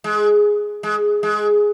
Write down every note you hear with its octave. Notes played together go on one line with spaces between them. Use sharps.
G#3
G#3
G#3